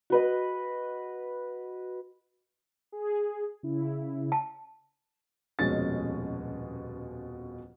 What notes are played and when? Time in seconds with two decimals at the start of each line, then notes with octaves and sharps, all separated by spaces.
0.10 F#4 B4 D#5
2.92 G#4
3.63 C#3 E4
4.32 A5
5.59 D#1 F2 B2 G#3 C#4 A6